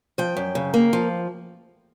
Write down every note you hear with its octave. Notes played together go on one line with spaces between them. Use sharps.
F3 G5
F#2
C#3
A#3
F3